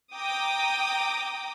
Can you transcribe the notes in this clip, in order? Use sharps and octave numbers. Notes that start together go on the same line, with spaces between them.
G5 A#5 D6 D#6